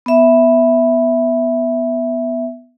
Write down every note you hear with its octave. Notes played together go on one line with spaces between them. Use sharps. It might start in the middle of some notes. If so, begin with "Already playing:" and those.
B3 E5